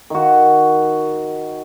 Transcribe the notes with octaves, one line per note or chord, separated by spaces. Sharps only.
D#3 F#4